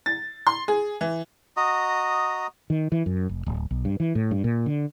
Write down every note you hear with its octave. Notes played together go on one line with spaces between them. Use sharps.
A6
C6
G#4
E3
F#4 D#5 A#5 D#6
D#3
E3
F#2
F1
D1
B1
G2
E3
A2
G2
A#2
D3